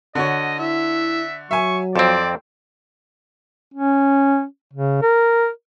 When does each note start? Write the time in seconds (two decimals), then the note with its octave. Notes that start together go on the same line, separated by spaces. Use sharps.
0.15 D3 F#4 C#5 D#5
0.59 E4 E5
1.51 F#3 E5 G#5 C#6
1.96 F2 C4 C5 D5
3.74 C#4
4.73 C#3
5.02 A#4